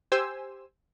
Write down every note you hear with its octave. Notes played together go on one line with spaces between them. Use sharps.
G4 C5 G#5 E6